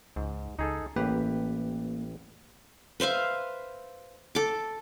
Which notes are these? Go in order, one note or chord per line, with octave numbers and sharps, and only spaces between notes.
C#2 G#2
C#2 D#4 G#4 A4
A1 A#3 G4 B4
B4 C5 E5 F5
A4 D6